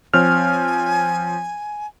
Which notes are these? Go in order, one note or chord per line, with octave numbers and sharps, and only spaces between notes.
F3 C4 C#5 G#5 F6